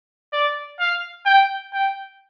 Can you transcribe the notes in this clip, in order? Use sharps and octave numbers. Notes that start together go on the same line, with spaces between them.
D5
F5
G5
G5